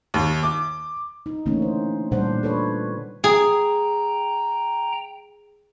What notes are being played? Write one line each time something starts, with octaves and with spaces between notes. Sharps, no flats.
D#2
D6
D#4
D3 E3 A3 A#3 C#4 D#4
C5
A#2 D3 G3 D4 C5 F#5
A4 B4 C#5
G#4 G5 A#5